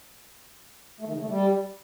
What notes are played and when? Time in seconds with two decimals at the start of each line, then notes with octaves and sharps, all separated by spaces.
1.01 A3
1.07 D#3
1.14 C#3
1.21 A3
1.27 G3